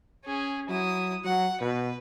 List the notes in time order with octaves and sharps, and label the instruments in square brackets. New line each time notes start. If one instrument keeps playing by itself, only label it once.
[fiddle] C#4 G#4
[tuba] F#3 [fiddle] E4 D#6
[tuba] F#3 [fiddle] F#5
[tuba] B2 [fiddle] B4